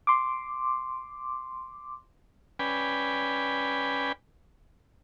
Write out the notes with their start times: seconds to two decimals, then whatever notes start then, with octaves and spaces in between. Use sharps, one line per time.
0.07 C6 D6
2.59 C#4 B4 D5 G5 G#5 B5